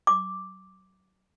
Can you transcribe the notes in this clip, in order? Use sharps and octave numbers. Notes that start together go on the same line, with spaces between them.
D6